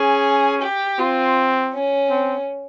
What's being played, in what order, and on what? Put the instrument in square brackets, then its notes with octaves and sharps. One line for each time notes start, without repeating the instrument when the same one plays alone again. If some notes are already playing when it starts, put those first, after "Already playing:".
Already playing: [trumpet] C#4 [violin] G#4
[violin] G4
[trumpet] C4 [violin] F4
[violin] C#4
[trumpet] C4